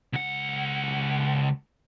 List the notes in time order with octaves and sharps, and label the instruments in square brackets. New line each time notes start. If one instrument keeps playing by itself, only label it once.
[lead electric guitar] C#2 F#5